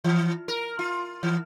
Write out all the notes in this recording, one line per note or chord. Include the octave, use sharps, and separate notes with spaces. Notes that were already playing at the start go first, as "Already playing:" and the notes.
E3
A#4
F4
E3